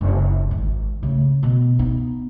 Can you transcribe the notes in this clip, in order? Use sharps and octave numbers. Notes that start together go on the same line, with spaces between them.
F#1
G#1 D#3
C#3 A3
B2 B3
B3 D#4